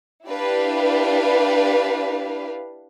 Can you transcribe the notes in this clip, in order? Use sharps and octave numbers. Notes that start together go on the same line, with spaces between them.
D4 E4 G4 B4 F5